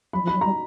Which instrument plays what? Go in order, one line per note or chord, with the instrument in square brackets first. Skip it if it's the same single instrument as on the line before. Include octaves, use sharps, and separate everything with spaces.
[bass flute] F#3 [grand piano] B5
[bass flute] F3
[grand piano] B5
[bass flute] F#3
[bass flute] G3 [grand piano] A#5